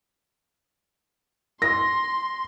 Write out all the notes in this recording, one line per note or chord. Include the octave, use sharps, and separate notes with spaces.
C6 A#6